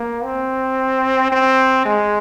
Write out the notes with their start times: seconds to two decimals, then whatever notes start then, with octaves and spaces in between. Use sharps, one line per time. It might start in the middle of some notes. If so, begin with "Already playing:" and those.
Already playing: A#3
0.24 C4
1.32 C4
1.85 G#3